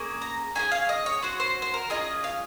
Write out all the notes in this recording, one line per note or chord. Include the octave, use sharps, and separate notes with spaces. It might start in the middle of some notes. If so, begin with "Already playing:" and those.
Already playing: A#3 C#4 G#4
A#5
C#4 F4 G#4 G#5
F5
D#5
C#5
C#4 F#4 C5
C5
C5
A#4
C#4 F4 G#4 D#5
F5